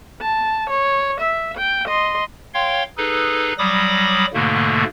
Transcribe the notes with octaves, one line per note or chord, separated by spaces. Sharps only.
A5
C#5
E5
G5
D#5 C6
C#5 F5 G5 C6
D#4 G#4 A4 B4
F#3 G3 B5 D6 D#6 A#6
G#2 B2 D3 A3 A#3